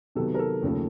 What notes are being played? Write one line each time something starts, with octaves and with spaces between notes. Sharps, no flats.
C3 D#3 F#3 B3 A4
A#4
A4
D#2 C#3 F3 A3